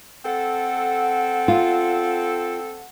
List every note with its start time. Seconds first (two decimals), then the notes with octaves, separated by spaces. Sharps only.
0.25 C4 A4 F#5
1.48 F4